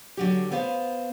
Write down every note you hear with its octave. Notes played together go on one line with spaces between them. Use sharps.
D3 F#3 G4
B3 C5 F5